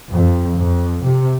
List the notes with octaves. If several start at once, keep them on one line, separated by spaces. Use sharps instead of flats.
F2
F2
C3